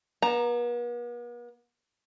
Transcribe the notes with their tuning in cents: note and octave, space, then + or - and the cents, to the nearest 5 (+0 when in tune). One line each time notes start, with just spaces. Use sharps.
B3 -45 A#5 +0